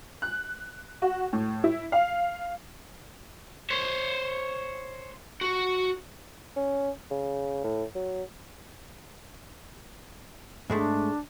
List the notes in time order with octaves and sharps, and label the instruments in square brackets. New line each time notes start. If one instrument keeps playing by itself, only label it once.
[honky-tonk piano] F#6
F#4
A2
E4
F5
[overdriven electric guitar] C5 C#5
F#4
[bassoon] C#4
C#3
A2
F#3
[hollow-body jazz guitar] G#2 G#3 A3 [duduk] D4